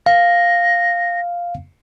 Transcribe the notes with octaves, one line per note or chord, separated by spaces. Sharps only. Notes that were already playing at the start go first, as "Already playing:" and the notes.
F5 A#6